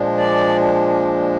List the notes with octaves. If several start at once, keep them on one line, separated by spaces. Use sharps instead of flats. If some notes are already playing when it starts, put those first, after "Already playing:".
Already playing: A#2 F3 G#3 D4
D5